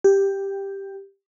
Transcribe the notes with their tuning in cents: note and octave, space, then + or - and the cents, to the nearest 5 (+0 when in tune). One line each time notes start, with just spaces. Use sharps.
G4 +5